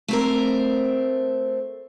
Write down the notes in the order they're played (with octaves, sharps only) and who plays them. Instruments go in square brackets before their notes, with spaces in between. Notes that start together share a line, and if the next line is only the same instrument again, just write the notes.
[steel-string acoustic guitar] A3 C4 A#4